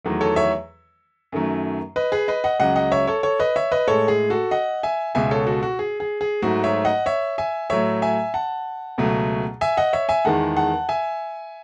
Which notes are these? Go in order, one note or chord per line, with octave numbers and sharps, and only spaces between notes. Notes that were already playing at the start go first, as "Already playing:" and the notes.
E2 D#3 F#3 A3
A4 C#5
C#5 E5
F#2 D#3 F#3 A3
B4 D#5
G#4 B4
B4 D#5
D#5 F#5
C#2 C#3 F#3 D#5 F#5
D#5 F#5
C#5 E5
A4 C#5
A4 C#5
B4 D#5
C#5 E5
B4 D#5
A2 G#3 A4 C#5
G#4
F#4 A4
D#5 F#5
E5 G#5
C#2 B2 G#3 E5 G#5
A4 C#5
F#4 A4
F#4
G#4
G#4
G#4
G#2 F#3 A3 F#4
C#5 E5
D#5 F#5
C#5 E5
E5 G#5
A2 F#3 A3 C#5 E5
E5 G#5
F#5 A5
C#2 B2 F#3 A3
E5 G#5
D#5 F#5
C#5 E5
E5 G#5
E2 D#3 G#3 F#5 A5
F#5 A5
E5 G#5